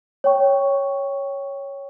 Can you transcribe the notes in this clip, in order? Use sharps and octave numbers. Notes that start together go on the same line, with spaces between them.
C#5 G5 C#6